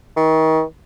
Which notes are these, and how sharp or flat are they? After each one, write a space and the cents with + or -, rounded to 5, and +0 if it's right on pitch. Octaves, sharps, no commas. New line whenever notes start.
D#3 +35